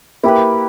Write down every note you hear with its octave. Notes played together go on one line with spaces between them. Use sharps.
A#3 E4 G4 B4